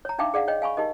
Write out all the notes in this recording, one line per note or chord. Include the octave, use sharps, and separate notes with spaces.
C#5 A#5
D4 D#4 E5 F5 G5 D6
G#4 D5 F5 F#5
C#5 D#5 G5
F5 G#5 B5 C#6
D#4 G4 A#4 D#5